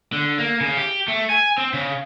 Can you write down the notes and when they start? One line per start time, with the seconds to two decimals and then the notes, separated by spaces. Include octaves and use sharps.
0.13 D3
0.39 A#3
0.61 C#3
0.77 G4
1.08 A3
1.30 G#5
1.58 C4
1.74 C#3